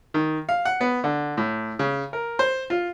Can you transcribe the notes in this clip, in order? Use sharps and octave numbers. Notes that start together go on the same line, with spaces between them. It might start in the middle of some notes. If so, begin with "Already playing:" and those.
D#3
F5
F#5
B3
D3
A2
C#3
A#4
C5
F4